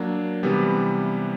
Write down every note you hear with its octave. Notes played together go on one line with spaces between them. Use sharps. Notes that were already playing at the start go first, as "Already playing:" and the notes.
Already playing: F#3 A#3 D4
C3 E3 G3 B3